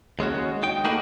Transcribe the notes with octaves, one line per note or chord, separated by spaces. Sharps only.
D#2 G#3 C#4 F#4
D#4 G5
A3 A#3 D#4 F#4 G#4 B4